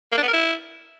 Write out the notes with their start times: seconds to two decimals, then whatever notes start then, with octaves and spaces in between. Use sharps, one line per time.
0.12 A#3
0.18 D4
0.23 B3
0.28 A#4
0.33 E4